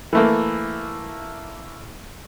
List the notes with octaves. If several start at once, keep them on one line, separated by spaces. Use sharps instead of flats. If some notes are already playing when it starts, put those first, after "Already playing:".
E3 A3 A#3